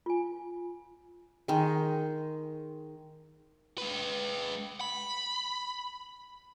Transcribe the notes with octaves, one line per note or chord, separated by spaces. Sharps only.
F4 G#5
D#3 G#3
G#3 B4
B5